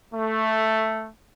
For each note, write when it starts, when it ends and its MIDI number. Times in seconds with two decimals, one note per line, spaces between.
0.13 1.09 57